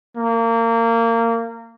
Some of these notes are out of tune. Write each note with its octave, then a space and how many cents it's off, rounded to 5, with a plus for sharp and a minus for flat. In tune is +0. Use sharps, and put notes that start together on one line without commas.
A#3 -25